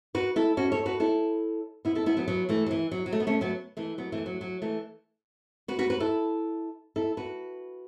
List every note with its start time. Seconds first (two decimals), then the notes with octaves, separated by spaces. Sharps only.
0.15 F#4 B4
0.36 E4 A4
0.57 C#4 F#4
0.72 A4 C#5
0.86 F#4 B4
1.00 E4 A4
1.85 B3 E4
1.95 E4 A4
2.06 B3 E4
2.17 F#3 B3
2.28 F#3 B3
2.49 E3 A3
2.66 F#3
2.71 E3
2.91 F#3
3.06 F#3
3.13 A3
3.20 B3
3.27 A3 C#4
3.41 F#3 B3
3.77 E3 A3
3.98 F#3 B3
4.12 E3 A3
4.26 F#3
4.41 F#3
4.62 E3 A3
5.68 F#4 B4
5.79 F#4 B4
5.90 F#4 B4
6.00 E4 A4
6.96 E4 A4
7.17 F#4 B4